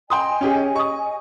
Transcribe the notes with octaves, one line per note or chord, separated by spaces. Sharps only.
D#5 G5 G#5 C6 D#6
C#4 G4 G#4
C#6 D#6